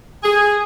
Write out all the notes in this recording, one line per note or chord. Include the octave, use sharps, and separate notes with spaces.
G#4